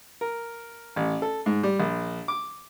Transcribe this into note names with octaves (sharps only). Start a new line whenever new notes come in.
A#4
A1
A4
G#2
G3
A#1
D6